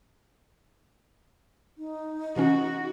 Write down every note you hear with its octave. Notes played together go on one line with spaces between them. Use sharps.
D#4
C3 E3 C#4 F#4